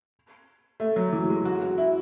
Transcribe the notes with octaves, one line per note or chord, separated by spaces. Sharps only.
A3
F#3
E3
G#3
F#4
F#4
E4